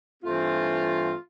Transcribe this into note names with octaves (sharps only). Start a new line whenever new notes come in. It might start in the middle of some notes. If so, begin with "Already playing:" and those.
G2 E3 A3 C4 F4